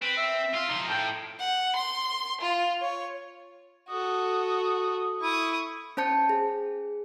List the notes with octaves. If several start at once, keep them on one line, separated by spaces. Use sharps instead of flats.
C4 B4
E5
F4 C6
F3 D#4
A2 G5
F#5
C6
F4
C#5
F#4 A4 D#6
E4 C#6 D#6
C#4 C5 A5 G6 C#7
G#4